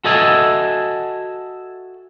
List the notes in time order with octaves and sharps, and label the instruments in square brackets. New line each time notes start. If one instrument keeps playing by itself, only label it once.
[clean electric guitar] F#4 A4 D#5 E5 G#5